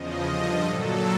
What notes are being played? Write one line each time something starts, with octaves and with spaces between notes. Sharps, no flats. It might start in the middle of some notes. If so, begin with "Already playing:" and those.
Already playing: E2 C#3 F3 D#5
G2 D3 F3
A#2 F#3 A4